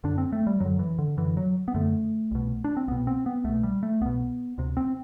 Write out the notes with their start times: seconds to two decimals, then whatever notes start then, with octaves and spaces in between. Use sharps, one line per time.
0.04 F#2 D3 D4
0.18 C4
0.32 A3
0.47 G3
0.60 F#2 D3 F#3
0.79 E3
0.99 D3
1.17 F#2 D3 E3
1.37 F#3
1.68 B3
1.74 F#2 D3 A3
2.31 C2 B2
2.64 D4
2.77 C4
2.88 C2 B2 B3
3.07 C4
3.26 B3
3.44 C2 B2 A3
3.63 G3
3.83 A3
4.01 C2 B2 B3
4.58 D2 C3
4.77 C4